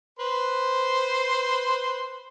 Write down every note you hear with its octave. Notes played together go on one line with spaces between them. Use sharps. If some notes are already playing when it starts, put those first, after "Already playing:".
B4 C5 C6